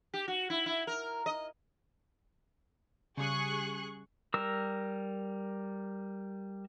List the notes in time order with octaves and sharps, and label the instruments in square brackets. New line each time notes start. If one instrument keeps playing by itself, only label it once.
[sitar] G4
F#4
E4
E4
A#4
D#5
[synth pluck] C#3 G3 [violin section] G#4 C#6 F#6
[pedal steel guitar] G3 A#4 E6